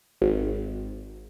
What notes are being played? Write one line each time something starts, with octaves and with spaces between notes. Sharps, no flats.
G#1